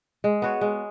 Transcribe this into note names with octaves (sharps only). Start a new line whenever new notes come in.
G#3
B3 F#4 C#5
G#3